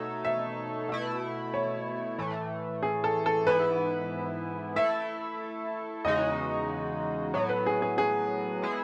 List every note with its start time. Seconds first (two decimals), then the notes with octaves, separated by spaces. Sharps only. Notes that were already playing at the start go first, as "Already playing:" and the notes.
Already playing: B2 A3 D#4 A4 C#5
0.25 E5
0.89 B2 A3 E4
1.54 C#5
2.18 A2 E3 A3
2.83 G#4
3.04 A4
3.26 A4
3.46 G#2 E3 B3 E4 B4
4.76 A3 E4 A4 E5
6.05 E2 C#3 G#3 D#4 F#4 D#5
7.34 A2 F#3 B3 C#5
7.49 B4
7.66 G#4
7.82 G#4
7.98 G#4
8.62 G#3 B3 E4 G#4